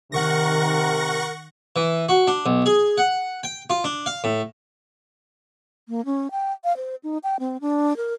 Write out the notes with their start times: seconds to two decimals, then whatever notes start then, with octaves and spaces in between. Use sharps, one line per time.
0.12 C3 D#3 A#4 F#5 C#6 A#6
1.76 E3
2.09 F#4
2.27 D4
2.46 B1
2.66 G#4
2.98 F#5
3.43 G5
3.70 F4
3.84 D4
4.06 F5
4.24 A2
5.89 A#3
6.05 C#4
6.31 G5
6.64 F5
6.77 C5
7.03 D#4
7.24 G5
7.40 C4
7.61 D4
7.97 A#4